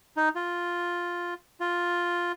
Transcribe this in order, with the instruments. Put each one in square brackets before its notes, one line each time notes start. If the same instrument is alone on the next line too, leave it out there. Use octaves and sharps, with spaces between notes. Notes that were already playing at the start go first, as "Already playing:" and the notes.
[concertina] D#4
F4
F4